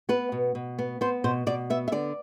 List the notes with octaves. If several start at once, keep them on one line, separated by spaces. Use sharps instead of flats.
B3 B4
B2
B2
B3
B3 C5
B2 C5
B2 D5
B3 E5
E5
D3 D5